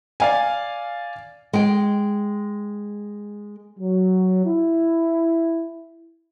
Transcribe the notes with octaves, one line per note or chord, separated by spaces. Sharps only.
D5 F5 G#5
G#3 G5
F#3
E4